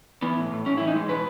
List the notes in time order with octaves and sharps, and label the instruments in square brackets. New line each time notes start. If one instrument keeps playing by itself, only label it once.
[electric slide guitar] E3 B3
A2
A2
A2 C#4
E3 E4
D#4
G#3
B2 B4